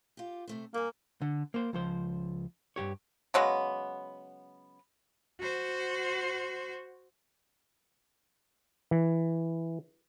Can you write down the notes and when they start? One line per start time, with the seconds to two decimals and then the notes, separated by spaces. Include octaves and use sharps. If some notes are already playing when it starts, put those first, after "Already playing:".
0.17 F4 G4
0.47 C3 A3 C5
0.74 G2 A#3 G#5
1.21 D3
1.54 A#3 C5
1.73 C#2 F3 C5
2.76 G2 A#2 G4 C#5
3.34 C#3 F#3 G#3 B3
5.41 F#4 C5
8.91 E3